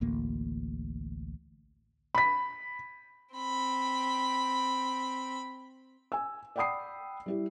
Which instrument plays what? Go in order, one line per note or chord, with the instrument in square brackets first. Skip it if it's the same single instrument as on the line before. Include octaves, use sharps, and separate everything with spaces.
[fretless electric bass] A1 D2 A#3
[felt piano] B5 B6
[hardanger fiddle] C4 B5
[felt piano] G#5 E6
D5 F#5 G5 B5 D#6 C7
G3 E4 G4